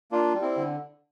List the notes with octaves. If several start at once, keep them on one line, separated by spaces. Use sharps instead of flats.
A#3 D4 F4
G3
C4 E4
D3